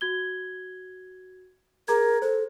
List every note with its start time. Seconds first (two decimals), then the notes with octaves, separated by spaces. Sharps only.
0.01 F#4 G#6 G7
1.88 G#4 A#4 A#5 G#6
2.22 A4 C5